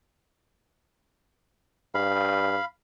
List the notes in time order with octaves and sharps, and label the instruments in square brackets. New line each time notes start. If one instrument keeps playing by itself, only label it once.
[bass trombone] G2 [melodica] F5 B5